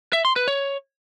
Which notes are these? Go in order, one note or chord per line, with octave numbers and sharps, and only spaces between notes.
E5
C6
B4
C#5